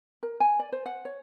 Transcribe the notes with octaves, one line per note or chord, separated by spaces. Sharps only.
A#4
G#5
D5
C5
F#5
C#5